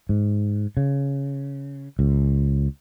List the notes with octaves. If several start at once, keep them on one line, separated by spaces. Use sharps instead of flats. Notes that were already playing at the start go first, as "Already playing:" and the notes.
G#2
C#3
C#2